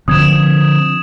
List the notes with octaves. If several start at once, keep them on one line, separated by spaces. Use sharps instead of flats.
D3 F3 C4 D#6 G#6 E7